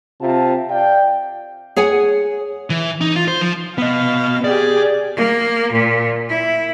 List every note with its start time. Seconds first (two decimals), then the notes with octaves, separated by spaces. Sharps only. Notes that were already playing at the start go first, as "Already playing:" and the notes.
0.21 C3 F4 F5 A5
0.70 D5 F5 G5
1.76 G#4 C#5 F#5 G#5
2.70 E3
3.01 D#4
3.16 F4
3.28 C5
3.41 F3
3.78 B3 D#5 F5
4.44 G4 G#4 D5
5.16 A#3
5.73 A#2
6.29 E4